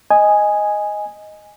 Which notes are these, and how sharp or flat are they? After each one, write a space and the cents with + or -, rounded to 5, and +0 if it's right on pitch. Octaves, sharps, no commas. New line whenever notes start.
D#5 +0 G#5 +0